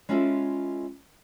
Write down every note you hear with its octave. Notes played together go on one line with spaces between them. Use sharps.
G#3 C#4 E4 F4 A4 E5